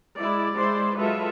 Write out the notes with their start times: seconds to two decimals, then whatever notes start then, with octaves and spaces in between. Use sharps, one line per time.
0.18 G#3 E4 D5
0.54 G#3 E4 C5 D5 C6
0.97 F#3 G#3 F4 A4 B4 E5